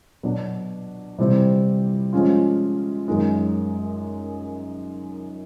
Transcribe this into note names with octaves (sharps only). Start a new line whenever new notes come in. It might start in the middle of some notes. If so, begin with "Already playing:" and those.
B2 F#3 B3 D4 F#4
C3 E3 G3 C4 E4
F3 G#3 C#4 F4
F#2 D#3 G#3